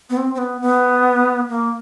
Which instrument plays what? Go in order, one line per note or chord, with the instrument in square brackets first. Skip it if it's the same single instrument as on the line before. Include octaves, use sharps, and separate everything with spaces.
[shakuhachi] B3
C4
C4
B3
B3
A#3